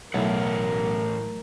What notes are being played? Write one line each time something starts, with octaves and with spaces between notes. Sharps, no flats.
B1 A2 E3 F#3 A3 E4 A#4 F#5